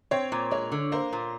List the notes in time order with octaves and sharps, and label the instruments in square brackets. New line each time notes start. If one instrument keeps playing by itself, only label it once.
[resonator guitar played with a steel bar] C4 [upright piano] C#5
[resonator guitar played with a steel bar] A#2
[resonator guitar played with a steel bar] G#3 [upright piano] C#5
[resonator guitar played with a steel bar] D3
[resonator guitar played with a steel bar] A#3 [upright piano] C5
[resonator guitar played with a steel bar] A#2